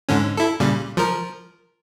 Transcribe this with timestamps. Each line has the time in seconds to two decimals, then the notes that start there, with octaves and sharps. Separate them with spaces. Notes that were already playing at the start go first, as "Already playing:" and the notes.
0.09 G#2 D3 C#4
0.37 E4 A4
0.60 A#2 C#3 G3
0.97 F3 A#4